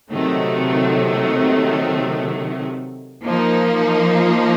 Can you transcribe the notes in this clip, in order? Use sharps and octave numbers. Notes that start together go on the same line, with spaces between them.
C3 D#3 F#3 A3
F3 A#3 D#4